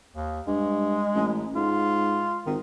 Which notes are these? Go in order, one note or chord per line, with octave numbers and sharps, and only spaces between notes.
D#2
G2 G#3
A1
G#2 F4
G#1 D#3